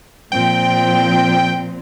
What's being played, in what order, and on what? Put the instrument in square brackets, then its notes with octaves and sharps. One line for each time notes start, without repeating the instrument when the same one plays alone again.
[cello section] A#2 F3 C4 [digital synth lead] G5